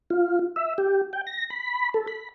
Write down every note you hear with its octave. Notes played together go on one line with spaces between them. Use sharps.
F4
E5
G4
G5
A#6
B5
A4
B5